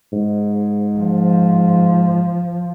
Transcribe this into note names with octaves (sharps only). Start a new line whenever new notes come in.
G#2
F3